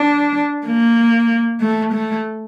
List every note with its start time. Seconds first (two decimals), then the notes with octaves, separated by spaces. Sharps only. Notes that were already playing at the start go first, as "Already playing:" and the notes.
Already playing: D4
0.67 A#3
1.61 A3
1.93 A3